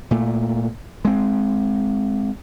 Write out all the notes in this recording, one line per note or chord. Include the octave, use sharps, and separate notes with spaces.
A#2 A3
G#3 C4